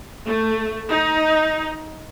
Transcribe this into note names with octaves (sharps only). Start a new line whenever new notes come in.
A3
D#4